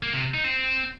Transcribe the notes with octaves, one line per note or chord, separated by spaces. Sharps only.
A#3
C3
D#4
C4